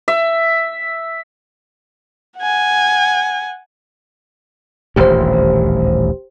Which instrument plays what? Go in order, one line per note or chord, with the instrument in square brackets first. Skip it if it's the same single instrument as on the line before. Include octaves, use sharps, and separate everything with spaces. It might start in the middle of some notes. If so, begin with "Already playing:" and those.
[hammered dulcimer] E5
[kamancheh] F#5 G#5
[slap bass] D#1 A1 D2 [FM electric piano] G4 C5